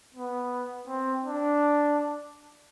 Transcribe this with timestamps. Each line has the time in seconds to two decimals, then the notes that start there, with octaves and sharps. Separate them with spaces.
0.15 B3
0.87 C4
1.24 D4